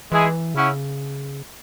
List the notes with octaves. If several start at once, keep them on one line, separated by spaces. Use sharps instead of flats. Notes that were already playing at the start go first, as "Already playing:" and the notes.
E3 G#3 E4 G#4
C#3 C#4 E4 C#5 F#5